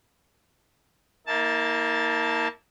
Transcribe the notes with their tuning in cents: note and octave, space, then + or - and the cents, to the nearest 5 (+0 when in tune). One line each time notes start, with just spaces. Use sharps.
A#3 +0 E4 -45 A5 +0